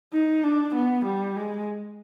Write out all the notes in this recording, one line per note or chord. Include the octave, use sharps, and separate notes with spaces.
D#4
D4
B3
G3
G#3